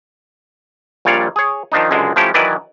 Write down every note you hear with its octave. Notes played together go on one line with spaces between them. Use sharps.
A#1 A#2 G3 C#5 D5 F5
G#4 C#5
D#3 F3 D4 D#4
C#2 F#2 D3 G#3
F3 A3 C#4 E4 G4
D#3 E3 F#3 E4 B4 D5